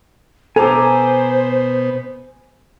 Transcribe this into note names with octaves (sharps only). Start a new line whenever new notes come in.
B2 B3 A4 C5 G#5 A#5 D6